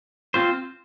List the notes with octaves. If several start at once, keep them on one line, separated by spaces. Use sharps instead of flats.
C4 F4 C5